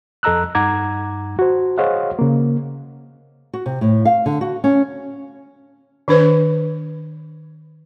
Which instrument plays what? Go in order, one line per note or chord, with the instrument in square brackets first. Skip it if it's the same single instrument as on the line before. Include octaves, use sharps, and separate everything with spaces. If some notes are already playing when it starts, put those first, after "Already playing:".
[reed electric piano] F2 A4 D#5 A#5 E6 F#6
G2 D#4 F#5 A#5 D6 G#6
F#4 C5
G#4 C5 C#5 D#5 F5 F#5
C#3 A#3
[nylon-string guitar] F#4
C3
A2
F5
D3
F#4
C#4
[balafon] D#3 D4 B4 C5